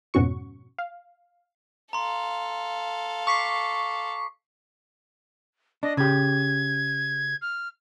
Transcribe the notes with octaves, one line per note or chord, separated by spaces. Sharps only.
F2 G#2 B2 C#4 F#4 C#6
F5
A4 F5 A#5 C6
C#6 D6 B6 C7
D4 D#5
C#3 G4 G#6
F6